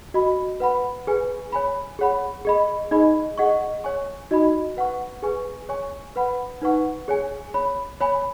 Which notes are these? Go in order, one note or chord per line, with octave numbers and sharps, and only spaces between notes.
F#4 D#5 B5
B4 F#5 B5
G#4 B4 G#5
C#5 G#5 B5
G#4 C#5 F#5 B5
G#4 D#5 B5
D#4 G#4 D#5 B5
G#4 D#5 F#5 C#6
C#5 G#5 C#6
D#4 F#4 D#5 B5
B4 F#5 C#6
G#4 B4 G#5 C#6
C#5 G#5 C#6
B4 F#5 B5
D#4 B4 F#5 C#6
G#4 C#5 G#5
C#5 B5
C#5 G#5 B5